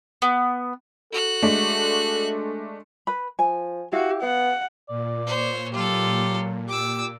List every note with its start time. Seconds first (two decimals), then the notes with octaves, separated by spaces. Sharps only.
0.22 B3
1.12 F#4 A4 F#6
1.42 G#3 A3 D4
3.07 B4 B5
3.39 F3 G#5
3.92 E4 F#4 G4 F5
4.22 B3 F5 F#5
4.89 A#2 D5
5.27 C5 C#5
5.74 F#3 F4 G4 A4
6.68 G4 D6 E6